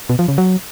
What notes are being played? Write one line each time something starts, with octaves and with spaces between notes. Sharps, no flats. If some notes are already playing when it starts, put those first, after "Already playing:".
B2
F3
C#3
F#3